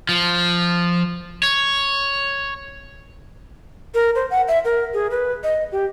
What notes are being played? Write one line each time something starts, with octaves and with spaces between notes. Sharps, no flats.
F3
C#5
A#4
C5
F#5
E5
A#4
G#4
B4
D#5
G4